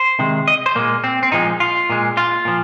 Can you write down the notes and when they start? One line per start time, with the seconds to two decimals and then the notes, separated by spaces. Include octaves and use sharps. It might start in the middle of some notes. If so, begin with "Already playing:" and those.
Already playing: C5
0.19 C3 D#3 G#3
0.48 D#5
0.66 C5
0.75 A#2 G#3 A#3
1.04 C4
1.23 C4
1.32 A#2 F3 G#3 D#4
1.60 F4
1.90 A#2 G#3
2.17 F4
2.45 A#2 F3